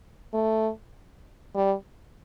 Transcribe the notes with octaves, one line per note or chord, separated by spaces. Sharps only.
A3
G3